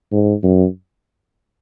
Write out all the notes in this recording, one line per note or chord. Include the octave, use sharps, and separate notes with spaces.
G#2
F#2